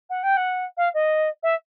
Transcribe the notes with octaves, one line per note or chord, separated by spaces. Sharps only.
F#5
G5
F#5
F5
D#5
E5